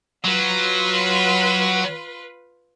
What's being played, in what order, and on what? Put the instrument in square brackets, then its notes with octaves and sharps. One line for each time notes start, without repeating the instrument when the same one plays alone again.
[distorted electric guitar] F#3 [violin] F4 B4